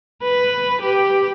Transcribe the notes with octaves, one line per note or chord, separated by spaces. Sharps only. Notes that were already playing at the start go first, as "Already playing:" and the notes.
B4
G4